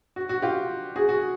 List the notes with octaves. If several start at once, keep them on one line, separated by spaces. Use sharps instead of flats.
F#4
F#4
F4 G4
F#4 G#4
F#4